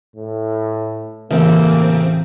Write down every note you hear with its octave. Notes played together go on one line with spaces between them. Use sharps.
A2
A1 C#3 A#3 C4